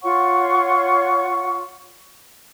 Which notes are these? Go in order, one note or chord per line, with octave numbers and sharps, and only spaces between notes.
F4 C#5 F#5 C#6